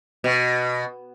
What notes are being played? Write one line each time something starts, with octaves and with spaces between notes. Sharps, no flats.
B2